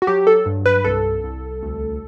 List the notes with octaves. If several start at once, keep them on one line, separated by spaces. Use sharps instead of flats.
F#4
F#3 G4
A4
G2
B4
C2 A4
C2
D2